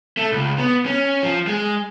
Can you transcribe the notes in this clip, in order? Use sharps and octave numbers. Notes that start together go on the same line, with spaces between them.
A3
C#2
B3
C#4
F3
G#3